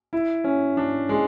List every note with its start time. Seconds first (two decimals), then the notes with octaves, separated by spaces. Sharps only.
0.13 E4
0.44 C#4
0.77 D4
1.09 G#3